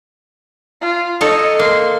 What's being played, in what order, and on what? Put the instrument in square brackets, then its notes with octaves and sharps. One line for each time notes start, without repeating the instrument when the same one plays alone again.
[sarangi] F4
[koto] D#4 A4 C#5 [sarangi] D#5
[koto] A#3 [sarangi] C6